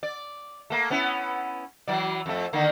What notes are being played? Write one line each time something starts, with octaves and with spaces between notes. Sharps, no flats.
D5
A3 A#3
B3 C#4 E4
E3 F#3 D5
F2 A3
D3 D#3 A#3